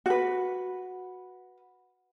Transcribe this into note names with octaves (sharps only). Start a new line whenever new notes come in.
F#4 B4